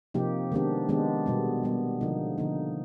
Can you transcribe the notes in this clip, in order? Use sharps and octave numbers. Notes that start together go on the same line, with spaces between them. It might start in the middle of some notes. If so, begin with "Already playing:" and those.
C3 F3 A#3 D#4 G4
D#3 G#3 B3 D4 G4
D#3 G#3 B3 D4 G4
B2 G3 B3
B2 G3 B3
D3 F3 A#3 D#4
D3 F3 A#3 D#4